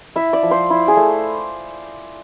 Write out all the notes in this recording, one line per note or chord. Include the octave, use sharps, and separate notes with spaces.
E4 E5
D5
F3
C5
E4
G#4
A3